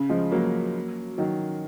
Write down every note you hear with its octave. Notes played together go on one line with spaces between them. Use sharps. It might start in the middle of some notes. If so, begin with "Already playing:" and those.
Already playing: C#3
F3 G#3
F#3 A#3
D#3 F#3